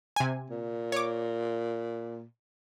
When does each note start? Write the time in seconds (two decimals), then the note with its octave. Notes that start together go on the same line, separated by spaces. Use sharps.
0.16 C3 G#5
0.50 A#2
0.92 C#5 D6